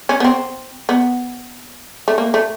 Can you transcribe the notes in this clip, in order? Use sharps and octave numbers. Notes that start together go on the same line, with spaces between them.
C#4
B3
C4
B3
A3
A#3
A3